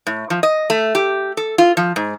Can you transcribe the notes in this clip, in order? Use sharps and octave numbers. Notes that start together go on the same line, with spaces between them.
A2
F3
D#5
A3
G4
A4
F4
F3
G#2